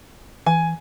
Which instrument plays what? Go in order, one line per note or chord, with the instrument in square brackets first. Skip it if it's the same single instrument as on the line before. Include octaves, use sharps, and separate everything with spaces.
[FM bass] E3 [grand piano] G#5